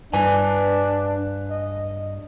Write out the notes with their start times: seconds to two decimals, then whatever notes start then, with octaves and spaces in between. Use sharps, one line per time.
0.13 G2 D4 B4 G#5
1.51 D#5